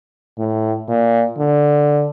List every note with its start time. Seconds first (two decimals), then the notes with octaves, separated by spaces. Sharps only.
0.38 A2
0.88 A#2
1.38 D3